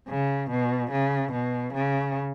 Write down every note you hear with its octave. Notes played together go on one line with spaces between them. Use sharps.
C#3
B2
C#3
B2
C#3